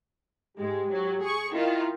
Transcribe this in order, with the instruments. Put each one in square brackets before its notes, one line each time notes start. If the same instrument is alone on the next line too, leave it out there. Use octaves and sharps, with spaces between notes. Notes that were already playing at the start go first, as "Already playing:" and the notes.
[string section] G#2 G#3 [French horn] G4
[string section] F#3
G#4 C#6
[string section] D#3 F4 [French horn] E4